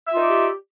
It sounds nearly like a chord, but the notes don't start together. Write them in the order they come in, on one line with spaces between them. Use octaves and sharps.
E5 F4 D#4 D5 G4